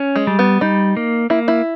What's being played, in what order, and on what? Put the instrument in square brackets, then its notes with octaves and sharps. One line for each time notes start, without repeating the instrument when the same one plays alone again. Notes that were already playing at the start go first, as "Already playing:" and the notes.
Already playing: [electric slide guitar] C#4
[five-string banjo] G#3
[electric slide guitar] G3
[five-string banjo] B3
[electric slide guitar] G3 [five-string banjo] D#4
[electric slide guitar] A#3
[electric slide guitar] A#3 [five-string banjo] E4
[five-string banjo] E4